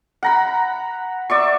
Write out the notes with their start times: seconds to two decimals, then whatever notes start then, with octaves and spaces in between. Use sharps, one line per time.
0.23 F#5 A#5 B5
1.30 D5 E5 C#6